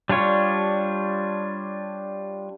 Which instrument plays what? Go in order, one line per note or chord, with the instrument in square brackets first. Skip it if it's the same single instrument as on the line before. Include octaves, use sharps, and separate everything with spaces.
[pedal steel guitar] G3 D4 F4 C#5